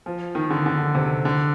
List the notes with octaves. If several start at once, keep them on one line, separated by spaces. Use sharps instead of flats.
F3
D#3
D3
D3
C3
D3